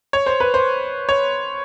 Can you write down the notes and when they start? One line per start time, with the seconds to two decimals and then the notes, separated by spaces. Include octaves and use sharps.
0.13 C#5
0.26 C5
0.40 B4
0.54 C5
1.09 C#5